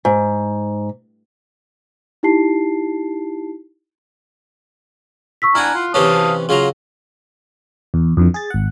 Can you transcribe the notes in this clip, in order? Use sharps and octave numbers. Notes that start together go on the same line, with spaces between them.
G#2
D#4 E4 G4 A5 C7
C#6 E6 B6
D4 E4 F#5 G#5 A#5 F6 F#6
F4
C3 E3 C#4 F5 A5 D#6
C#3 F#3 F4 A#5
E2
F2 D3 E3
G#4 A6
G#1 F#5